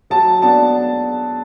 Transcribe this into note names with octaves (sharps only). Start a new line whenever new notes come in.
F#3 A5
B3 D4 A5